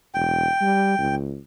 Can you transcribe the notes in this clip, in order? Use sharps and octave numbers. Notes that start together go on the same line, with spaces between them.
E1 G5
G3
C#2